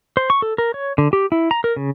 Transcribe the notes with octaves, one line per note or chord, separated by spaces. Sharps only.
C5
C#6
A4
A#4
C#5
D3
G4
E4
A#5
A#4
C#3